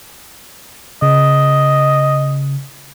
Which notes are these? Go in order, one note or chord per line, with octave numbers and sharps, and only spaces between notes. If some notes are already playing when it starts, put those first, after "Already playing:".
C#3 D#5